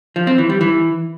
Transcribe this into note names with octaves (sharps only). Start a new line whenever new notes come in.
F3
C4
E3
G3
E3